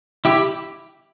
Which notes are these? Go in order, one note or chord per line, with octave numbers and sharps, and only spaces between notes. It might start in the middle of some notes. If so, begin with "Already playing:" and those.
E4 G4